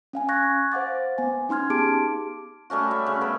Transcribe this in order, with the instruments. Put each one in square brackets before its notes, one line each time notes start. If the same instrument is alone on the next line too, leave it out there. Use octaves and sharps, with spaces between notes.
[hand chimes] C#4 F5 G#5
C#6 F#6 G#6 A#6
C5 F5 F#5 D6 A6
B3 G#5
C#4 D#4 C6 F6 G#6
B3 G4 G#4 A5 D6 D7
[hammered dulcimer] G3 A3 C#4 F#4
E5
C#3
B3 A#4